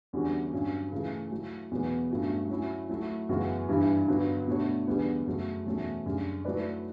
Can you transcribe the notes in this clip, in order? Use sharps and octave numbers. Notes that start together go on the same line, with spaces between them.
E2 D3 G3 C#4 F#4
G2 F#3 C#4
C#3 E3 A3
F#3 A3 E4
E2 B2 F#3 B3
G2 F#3 A3 C#4 F#4
F#3 C#4 E4
F#3 A3 E4
F#2 C#3 E3 B3 F#4
G2 E3 G3 D4
G2 D3 F#3 B3
B2 A3 D4 F#4 C#5
E2 D3 G3 B3
F#2 C#3 F#3 A3
E2 B2 F#3 A3 C#4
F#2 C#3 G3 D4
F#3 A3 E4 B4 D5